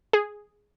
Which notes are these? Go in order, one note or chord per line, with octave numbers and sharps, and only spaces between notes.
G#4